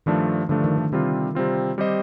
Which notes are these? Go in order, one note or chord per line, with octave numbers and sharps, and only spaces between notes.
G2 D#3 F3 A3 D4
G2 D3 F3 A3 D4
D#3
D#3
C3 D#3 G3 C4 F4
C3 G3 C4 F4
G3 C4 G4 C5 D#5